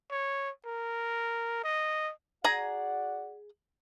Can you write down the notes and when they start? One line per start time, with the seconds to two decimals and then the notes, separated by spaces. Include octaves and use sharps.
0.11 C#5
0.66 A#4
1.64 D#5
2.44 F#4 G#4 D5 F#5 G#5 A#5